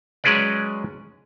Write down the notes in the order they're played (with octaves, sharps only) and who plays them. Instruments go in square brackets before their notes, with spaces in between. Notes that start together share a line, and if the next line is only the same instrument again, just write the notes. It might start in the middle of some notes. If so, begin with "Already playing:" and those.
[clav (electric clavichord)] F#3 G#3 C#4 G#4 B4 D5